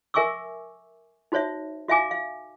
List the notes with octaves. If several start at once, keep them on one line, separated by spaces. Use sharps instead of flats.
A#4 E5 G#5 C#6 D6 E6
D#4 F#4 C5 C#5 E5
F#4 E5 F5 G#5 D6
F5